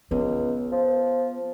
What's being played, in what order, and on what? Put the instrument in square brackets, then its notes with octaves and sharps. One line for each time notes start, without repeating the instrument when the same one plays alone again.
[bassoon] C#2 [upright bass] B3
[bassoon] F3